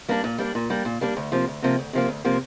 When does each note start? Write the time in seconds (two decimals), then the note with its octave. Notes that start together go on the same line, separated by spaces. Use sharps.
0.09 G3 A#3 D4
0.24 A#2
0.38 G3 A#3 D4
0.55 A#2
0.70 G3 A#3 D4
0.85 A#2
1.01 G3 A#3 D4
1.17 D2
1.32 C3 F3 A#3
1.47 D2
1.62 C3 F3 A#3
1.79 D2
1.93 C3 F3 A#3
2.08 D2
2.25 C3 F3 A#3